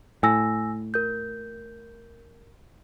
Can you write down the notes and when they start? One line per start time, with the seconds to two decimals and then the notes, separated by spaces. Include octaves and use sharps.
0.23 A2 G#5 E6 A#6
0.94 A#4 G6